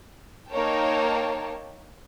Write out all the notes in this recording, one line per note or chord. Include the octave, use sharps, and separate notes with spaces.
A#3 D#4 A#4 C#5 G5 A5